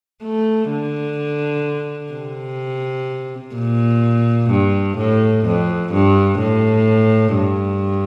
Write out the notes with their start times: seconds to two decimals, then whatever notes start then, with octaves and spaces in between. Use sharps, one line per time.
0.23 A3
0.70 D3
2.13 C3
3.55 A#2
4.50 G2
4.98 A2
5.46 F2
5.93 G2
6.40 A2
7.36 G2